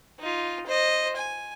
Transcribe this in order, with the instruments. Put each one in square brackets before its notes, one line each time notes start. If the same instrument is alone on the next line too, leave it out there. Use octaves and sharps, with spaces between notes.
[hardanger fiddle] D#4 F4
C5 D#5
G#5